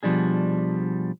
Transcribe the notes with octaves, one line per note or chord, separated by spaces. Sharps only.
B2 F3 G3 D4 G#4